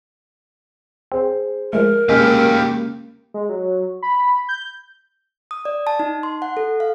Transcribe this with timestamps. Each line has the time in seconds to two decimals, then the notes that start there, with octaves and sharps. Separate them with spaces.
1.12 C4 G#4 C5
1.73 F3 G#3 A3 A#4
2.09 C#3 G#3 A#3 G4 D#5 F5 G#5
3.34 G#3
3.49 F#3
4.03 B5
4.49 G6
5.51 D#6
5.65 D5
5.87 A5
5.99 D#4
6.23 C6
6.42 F#5
6.57 A4
6.80 F5